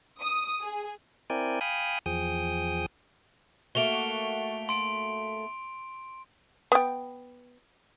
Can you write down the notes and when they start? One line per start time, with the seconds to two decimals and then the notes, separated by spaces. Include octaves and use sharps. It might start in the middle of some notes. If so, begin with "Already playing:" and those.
0.21 D#6
0.62 G#4
1.30 C4 E4 A#4 D5 G5 G#5
1.61 F5 G5 G#5 B5 D#6
2.06 E2 F3 G#4 G5 D#6
3.75 A3 A#3 F#4 D7 F7 G7
4.69 C6 D7
6.72 B3 G5